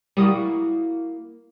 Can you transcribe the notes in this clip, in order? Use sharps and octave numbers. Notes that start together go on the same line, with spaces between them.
G3 A#3 E4 F#4 D#6